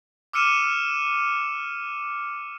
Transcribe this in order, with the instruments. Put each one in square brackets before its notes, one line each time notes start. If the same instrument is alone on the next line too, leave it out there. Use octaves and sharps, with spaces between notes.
[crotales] D6 E6 F6 C#7 D#7 E7